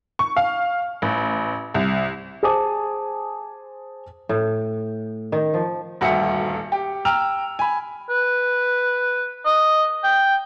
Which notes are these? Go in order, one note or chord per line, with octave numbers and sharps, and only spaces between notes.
C#6
F5
A1
C2
G#4 C5 G#5 A5 D6 D#6
A2
D#3
F3
D#1 D2 G2 F#4 E5 C#7
G4
G5 A#5 E6 F6 F7
G#5 B5
B4
D#5
G5